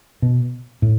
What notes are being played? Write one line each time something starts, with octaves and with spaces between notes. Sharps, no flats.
B2
A2